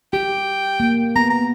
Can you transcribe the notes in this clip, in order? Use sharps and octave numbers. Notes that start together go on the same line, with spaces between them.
G4 G5
A#3
B3 A#5
A#5